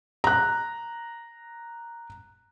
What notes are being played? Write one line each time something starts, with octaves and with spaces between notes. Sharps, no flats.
A#5 F#6